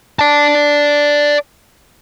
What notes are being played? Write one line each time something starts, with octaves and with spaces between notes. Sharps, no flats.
D5 A5